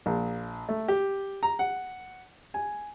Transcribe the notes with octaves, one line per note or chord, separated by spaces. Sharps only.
A#1
A3
G4
A#5
F#5
G#5